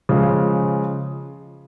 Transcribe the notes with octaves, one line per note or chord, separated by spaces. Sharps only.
C#3 F3 G#3